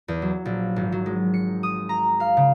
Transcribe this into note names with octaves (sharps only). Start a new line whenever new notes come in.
E2
F#3
A#1
G#1
F#3
G#3
C#7
D#6
A#5
F5
C#3